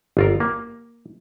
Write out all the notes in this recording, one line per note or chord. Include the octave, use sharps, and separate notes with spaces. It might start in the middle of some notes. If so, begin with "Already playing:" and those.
G1 F4 A#4
A#3